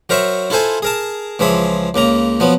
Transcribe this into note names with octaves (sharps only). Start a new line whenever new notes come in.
F#3 A#4 C5 E5 C#6
E4 F4 A4 C5 G#5
G#4 A#4 A5
C#2 E3 F3 G#4 E5
C#2 C#3 A#3 A#5
F3 F#3 B3